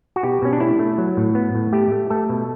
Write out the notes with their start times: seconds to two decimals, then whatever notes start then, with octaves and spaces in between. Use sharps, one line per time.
0.16 F#4
0.23 B2 G4
0.42 B2 C#4
0.53 D4
0.60 A3 E4
0.79 A3
0.98 F#3
1.17 A2
1.35 B3
1.55 A2
1.73 A3 G4
1.92 A3
2.10 A3 A4
2.29 B2